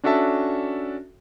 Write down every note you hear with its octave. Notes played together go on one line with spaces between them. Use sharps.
C#4 D4 F#4 A4 E5 A5